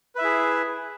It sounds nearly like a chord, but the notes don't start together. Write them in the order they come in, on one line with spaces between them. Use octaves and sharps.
B4 E5 E4 G#4